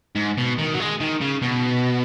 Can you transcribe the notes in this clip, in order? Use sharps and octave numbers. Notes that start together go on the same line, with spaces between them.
G#2
B2
D#3
F#3
G#3
D#3
C#3
B2